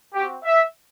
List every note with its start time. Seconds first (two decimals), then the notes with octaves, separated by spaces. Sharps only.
0.14 C4 F#4 G4
0.44 E5